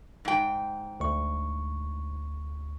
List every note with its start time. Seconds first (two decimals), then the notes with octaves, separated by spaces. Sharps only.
0.25 G#2 G5
1.00 D2 C#6